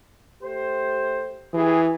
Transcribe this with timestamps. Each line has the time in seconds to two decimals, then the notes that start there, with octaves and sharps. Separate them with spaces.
0.42 A3 G4 C5
1.54 E3 G4 G#4